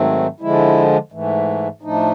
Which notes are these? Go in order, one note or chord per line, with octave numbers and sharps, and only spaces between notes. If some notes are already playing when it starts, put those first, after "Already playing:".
Already playing: G#2 D#3 F#3 A3 C4
D3 F3 G#3 E4
G#2 E3 A3
A2 F3 A3 D4 D#4